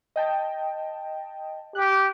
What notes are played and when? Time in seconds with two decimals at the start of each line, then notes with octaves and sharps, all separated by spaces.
0.16 D#5 G5 A5
1.75 G4 F#6